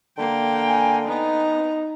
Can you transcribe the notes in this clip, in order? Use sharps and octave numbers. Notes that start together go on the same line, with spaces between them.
D3 A#3 G5
G#5
B3 D#4 A#5